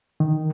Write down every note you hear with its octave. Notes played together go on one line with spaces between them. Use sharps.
D#3